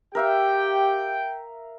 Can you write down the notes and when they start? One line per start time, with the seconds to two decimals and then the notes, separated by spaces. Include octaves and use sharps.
0.15 G4 A#4 E5 F5 G5